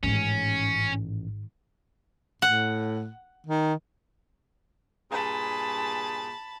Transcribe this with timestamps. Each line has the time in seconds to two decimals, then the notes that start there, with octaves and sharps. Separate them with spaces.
0.03 A1 G#2 D#3 C#4
2.42 A2 F#5
3.46 D#3
5.12 G2 A#2 G#4 A5 B5